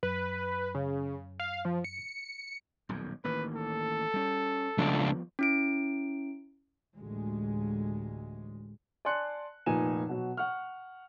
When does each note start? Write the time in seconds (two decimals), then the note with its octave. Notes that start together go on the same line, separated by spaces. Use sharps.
0.03 F#2 B4
0.75 C#3
1.40 F5
1.65 F3
1.84 C#7
2.89 D#1 B1 F2
3.24 A1 D#3 A#3 B4
3.56 A4
4.14 G3 C#4
4.78 C#2 F3 G3 B3 D4
5.39 C#4 E4 D7
6.96 A1 D2 G#3
9.05 D5 G#5 A5 C6 F#6 C#7
9.66 F1 A#2 D#4 B4 G#5 E7
10.09 B2 F#3
10.37 F#5 C#6 F6